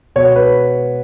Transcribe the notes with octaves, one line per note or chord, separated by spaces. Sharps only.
B2 C#5
B4